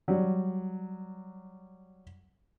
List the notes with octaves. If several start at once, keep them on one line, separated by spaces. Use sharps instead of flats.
F#3 G3